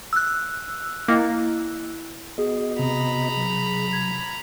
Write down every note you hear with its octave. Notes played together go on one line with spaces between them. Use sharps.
E6 F#6
A#3 E4 D#5 G5
B3 F#4 G#4 D#5
C3 A#5 B5
F#3
G#6